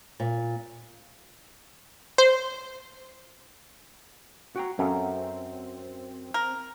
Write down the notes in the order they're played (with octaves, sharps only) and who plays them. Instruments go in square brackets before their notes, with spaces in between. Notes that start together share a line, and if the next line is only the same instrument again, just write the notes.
[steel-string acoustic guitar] A#2
[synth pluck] C5
[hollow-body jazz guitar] F#4 G5 A#5
[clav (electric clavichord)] F#2 [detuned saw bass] C4 [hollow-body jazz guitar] C#4 A4 F5
[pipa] A#4